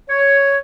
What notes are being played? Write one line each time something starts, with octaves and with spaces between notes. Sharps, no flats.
C#5